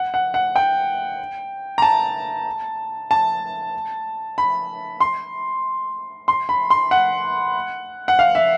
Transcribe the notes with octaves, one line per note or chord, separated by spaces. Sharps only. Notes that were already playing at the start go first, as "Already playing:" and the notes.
Already playing: F#5
F#5
F#5
G5
A#5
A5
A5
B5
C6
C6
B5
C6
F#5
F#5
F5
E5